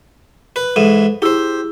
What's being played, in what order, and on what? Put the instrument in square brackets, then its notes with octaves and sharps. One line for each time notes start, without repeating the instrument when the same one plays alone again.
[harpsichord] B4
[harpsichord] G#2 E3 [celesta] A4 D#7 E7
[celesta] E4 G#4 E6 [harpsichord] G4 C5